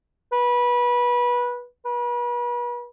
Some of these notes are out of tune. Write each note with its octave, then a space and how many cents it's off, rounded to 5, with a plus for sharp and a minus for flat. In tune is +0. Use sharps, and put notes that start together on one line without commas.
B4 -20
B4 -40